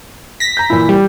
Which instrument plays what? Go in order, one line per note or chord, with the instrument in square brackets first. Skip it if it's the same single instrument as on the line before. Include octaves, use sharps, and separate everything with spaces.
[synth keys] A#6 B6
[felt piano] A#5 G6
A#2 E3 E4
[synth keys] G3